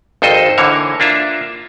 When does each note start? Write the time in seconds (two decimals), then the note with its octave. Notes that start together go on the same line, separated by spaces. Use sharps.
0.22 G#1 F2 A4 C5 D#5
0.58 D3 E3 A#3 C#5
1.00 A#3 D4 F4 E5